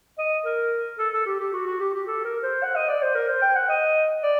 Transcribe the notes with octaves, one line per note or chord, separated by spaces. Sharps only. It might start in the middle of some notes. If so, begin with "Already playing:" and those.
D#5
A#4
A4
A4
G4
G4
F#4
F#4
G4
G4
A4
A#4
C5
F#5
D#5
D5
C5
A#4
C5
G5
F#5
D#5
D5